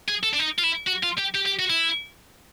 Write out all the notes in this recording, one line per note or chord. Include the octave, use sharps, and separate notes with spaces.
G#4
A4
D4
D#4
F4
E4
F#4
F4
G4
G4
G4
F#4
E4